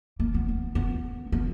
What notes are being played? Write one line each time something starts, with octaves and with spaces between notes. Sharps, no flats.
A#3
B3
B3
B3
B3